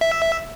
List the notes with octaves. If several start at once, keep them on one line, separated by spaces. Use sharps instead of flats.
E5